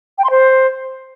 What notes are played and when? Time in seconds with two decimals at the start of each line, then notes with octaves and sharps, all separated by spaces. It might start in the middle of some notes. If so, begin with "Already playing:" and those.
0.18 G5
0.24 C6
0.30 C5